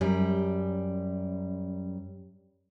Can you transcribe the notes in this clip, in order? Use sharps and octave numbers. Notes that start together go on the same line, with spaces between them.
F#2 G3